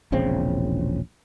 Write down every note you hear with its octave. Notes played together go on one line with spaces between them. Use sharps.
E1 A#1 C#3 C4